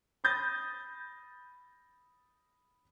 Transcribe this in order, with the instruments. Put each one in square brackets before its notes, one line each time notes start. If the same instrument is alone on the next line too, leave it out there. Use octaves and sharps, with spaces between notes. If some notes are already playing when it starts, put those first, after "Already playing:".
[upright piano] B5 D#6 G6 A6 A#6